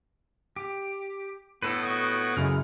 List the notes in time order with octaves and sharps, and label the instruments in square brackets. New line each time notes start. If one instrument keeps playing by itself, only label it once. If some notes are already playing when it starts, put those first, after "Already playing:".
[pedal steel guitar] G4
[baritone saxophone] A2 [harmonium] B3 [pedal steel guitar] A4 B4
[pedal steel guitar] F#4 D#5
[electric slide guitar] F#2 C#3 F#3 [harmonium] G#3 E4 [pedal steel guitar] F6